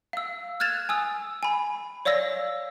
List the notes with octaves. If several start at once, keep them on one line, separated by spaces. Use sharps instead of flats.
F5 E6
F6 F#6 G#6 A6 E7 F7
G#5 D#6 E6
G#5 B5
C#5 D5 F5 E6 A#6